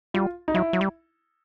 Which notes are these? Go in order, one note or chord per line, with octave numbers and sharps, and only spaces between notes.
G3 F4
D#4
F#3 E4
F#3
G3